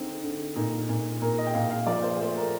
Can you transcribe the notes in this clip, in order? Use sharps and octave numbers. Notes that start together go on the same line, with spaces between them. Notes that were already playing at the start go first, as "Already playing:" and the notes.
Already playing: D3 C4 D#4
D3
A#2 D#4
A#2
A#2 A#4
D#5
G5
A#2 F5
F5
F3 D5
C5
A3 C5
A#4